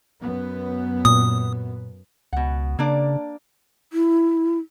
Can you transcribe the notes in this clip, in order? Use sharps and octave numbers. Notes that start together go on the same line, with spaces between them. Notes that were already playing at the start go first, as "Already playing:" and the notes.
F#2 B3
A#2 D#6
C#2 B2 F#5
C#3 A#3 D4 D5
E4